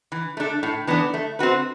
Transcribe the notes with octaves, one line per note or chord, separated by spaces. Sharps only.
E3
A3 D4 A4
A2
E3 B3 D4
A3
C4 F#4 B4